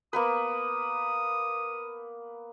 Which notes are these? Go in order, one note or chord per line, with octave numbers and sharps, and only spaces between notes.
A#3 B3 B4 D#6